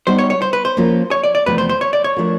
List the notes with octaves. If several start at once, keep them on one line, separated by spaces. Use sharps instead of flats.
G3 B3 D#4 C5
C#5
C#5
C5
B4
C5
F3 A#3 C#4 F4 A#4
C#5
D5
D5
E2 C3 F3 A3 B4
C5
C5
C#5
D5
C#5
F3 A3 D4 F4 A#4